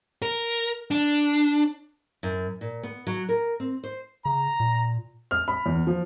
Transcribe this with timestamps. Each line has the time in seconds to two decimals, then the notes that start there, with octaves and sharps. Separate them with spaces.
0.22 A#4
0.91 D4
2.23 F#2
2.61 A#2
2.83 B3
3.07 F#3
3.29 A#4
3.60 C4
3.84 C5
4.25 C#3 A#5
4.60 A#2
5.31 F6
5.48 B5
5.66 E2
5.87 F3